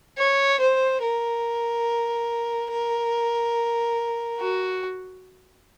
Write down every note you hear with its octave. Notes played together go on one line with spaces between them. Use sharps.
C#5
C5
A#4
A#4
F#4